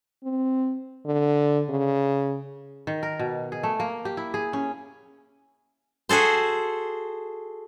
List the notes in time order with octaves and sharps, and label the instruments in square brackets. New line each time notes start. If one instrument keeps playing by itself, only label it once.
[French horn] C4
D3
C#3
[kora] D#3
A#4
B2
G#4
A3
A#3
G4
E4
G#4
C#4
[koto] F#4 G#4 A4 C5